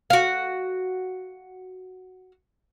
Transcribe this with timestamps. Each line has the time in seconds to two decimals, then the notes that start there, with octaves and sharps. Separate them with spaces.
0.10 F#4 F5